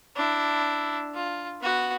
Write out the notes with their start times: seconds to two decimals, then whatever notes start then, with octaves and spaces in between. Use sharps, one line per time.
0.17 D4 E4
1.15 F4
1.62 B3 F#4